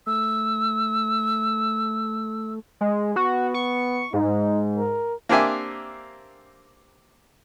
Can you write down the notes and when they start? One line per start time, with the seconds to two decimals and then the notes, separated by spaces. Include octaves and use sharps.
0.07 A3 E6
2.81 G#3
3.16 B3 F#4
3.54 C#6
4.13 G#2 D#4
4.77 A#4
5.29 A#3 C4 D4 G4 E5 G#5